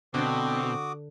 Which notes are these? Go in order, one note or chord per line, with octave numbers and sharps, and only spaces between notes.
B2 D3 C4 F#4 B4 D6 D#6